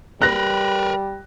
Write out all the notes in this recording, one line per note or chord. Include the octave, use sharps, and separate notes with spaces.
G3 A#4 B4 F#6 A#6